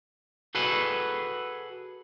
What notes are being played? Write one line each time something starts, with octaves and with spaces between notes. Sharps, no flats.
F#4 G#4 A4 B4